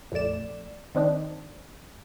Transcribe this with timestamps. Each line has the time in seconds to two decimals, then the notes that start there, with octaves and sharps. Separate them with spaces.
0.12 A#1 F2 A3 D5 E7
0.95 D#3 C4 D4 D#4